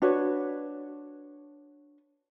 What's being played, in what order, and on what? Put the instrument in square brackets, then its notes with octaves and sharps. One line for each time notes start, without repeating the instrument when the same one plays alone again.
[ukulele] D4 F#4 B4 C#5